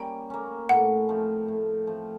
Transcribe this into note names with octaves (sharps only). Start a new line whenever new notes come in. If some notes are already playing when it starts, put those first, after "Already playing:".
Already playing: G3 A#3 C#4 G5
A#3 C#4
A2 F#5
F3 A3 C4
A2
F3 A3 C4